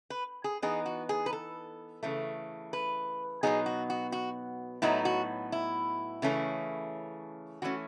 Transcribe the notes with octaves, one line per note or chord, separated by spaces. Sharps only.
B4
G#4
E3 B3 D#4 G#4
F#4
G#4
B4
A4
C#3 E3 A3
B4
B2 F#3 B3 D#4 G#4
F#4
F#4
F#4
A2 F#3 B3 D#4 E4
F#4
E4
C#3 E3 A3 C#4
E3 A3 C#4 F#4